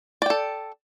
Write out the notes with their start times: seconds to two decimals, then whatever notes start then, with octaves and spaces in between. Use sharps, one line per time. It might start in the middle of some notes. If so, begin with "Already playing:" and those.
0.22 D5
0.26 G5
0.30 A4